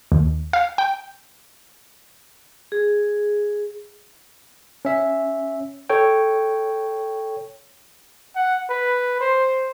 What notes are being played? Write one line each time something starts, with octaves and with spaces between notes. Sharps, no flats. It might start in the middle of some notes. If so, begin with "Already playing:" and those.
D#2
F5
G5
G#4
C#4 E5
A4 C#5 G5
F#5
B4
C5